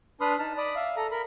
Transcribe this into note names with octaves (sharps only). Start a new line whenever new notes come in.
D4 B4 B5 C6 D#6 F6
D#4 A5 F6
D5 B5 D#6
E5 F5
A4 A#5
A#4 B5